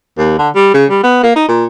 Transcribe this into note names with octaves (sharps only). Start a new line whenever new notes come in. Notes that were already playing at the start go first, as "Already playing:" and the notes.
D#2
D3
G3
C#3
G3
B3
A#3
D#4
A#2